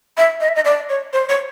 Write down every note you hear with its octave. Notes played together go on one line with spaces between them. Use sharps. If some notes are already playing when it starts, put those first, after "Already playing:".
E5
D#5
E5
D#5
D5
C#5
C5
C#5